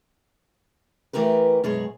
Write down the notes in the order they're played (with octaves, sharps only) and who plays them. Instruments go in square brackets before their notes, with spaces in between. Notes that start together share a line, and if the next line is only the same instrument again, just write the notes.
[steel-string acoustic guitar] E3 A3 G4 A#4 B4
F#2 B2 G#3 G#4 C#5